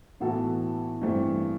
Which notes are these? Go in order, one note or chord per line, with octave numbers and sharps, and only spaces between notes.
A2 E3 B3 F#4 A4
G2 E3 A3 C4